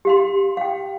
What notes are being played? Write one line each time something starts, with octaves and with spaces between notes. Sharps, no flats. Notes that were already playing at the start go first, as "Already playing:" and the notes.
G4 F5 C6
F5 G5